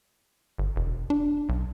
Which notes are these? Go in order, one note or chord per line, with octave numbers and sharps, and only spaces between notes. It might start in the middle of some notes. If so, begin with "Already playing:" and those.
G1
E1
D4
B1